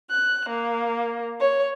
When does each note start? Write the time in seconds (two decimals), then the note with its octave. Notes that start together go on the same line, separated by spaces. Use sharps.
0.10 F#6
0.48 A#3
1.40 C#5